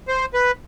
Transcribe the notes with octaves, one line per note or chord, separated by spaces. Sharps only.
C5
B4